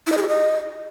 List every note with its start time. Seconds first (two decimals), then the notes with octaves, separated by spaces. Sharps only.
0.07 E4
0.12 D#5
0.17 G#4
0.22 G4
0.28 D#5